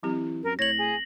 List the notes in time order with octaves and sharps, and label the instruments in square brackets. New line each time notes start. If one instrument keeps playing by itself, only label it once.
[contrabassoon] E3 [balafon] F#3 C4 G4
[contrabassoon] F#2 [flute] A#4
[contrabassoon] A2 [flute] C#5 [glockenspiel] A#6 F#7
[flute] G#4